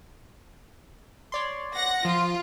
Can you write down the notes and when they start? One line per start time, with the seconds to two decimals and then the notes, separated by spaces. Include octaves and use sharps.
1.32 C#5 D5 C6
1.75 F#5 A#6
2.05 F3 F4